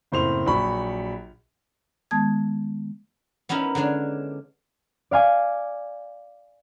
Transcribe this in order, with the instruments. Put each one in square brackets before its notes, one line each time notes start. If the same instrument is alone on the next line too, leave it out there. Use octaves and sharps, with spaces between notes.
[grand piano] F#1 A2 C4 C5 C6 F7
A#1 F#3 B5 C#6
[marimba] D#3 G#3 B3 A5 D#6 G#6
[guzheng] B3 C#4 D#4 E4 A#4
D3 G#3 C#4 D4
[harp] D5 F5 G#5 D6